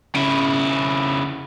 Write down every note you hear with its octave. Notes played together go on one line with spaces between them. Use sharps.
C#3 E4